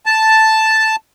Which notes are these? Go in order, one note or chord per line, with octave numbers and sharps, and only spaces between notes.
A5